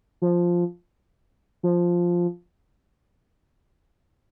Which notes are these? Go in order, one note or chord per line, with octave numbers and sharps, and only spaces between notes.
F3
F3